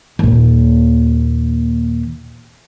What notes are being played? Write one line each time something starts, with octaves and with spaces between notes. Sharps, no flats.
D#2 A#2